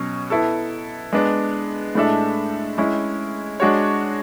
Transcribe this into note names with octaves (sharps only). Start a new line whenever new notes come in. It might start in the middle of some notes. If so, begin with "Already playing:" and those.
Already playing: B2 F#3 C#4
B3 E4 A4
G#3 B3 D4
A2 G#3 D4 A4 E5
G#3 C#4 E4
G#3 D4 F#4 C#5